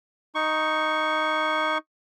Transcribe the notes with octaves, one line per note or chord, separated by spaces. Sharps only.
D#4 C#6